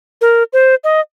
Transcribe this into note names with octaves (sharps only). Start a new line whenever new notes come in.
A#4
C5
D#5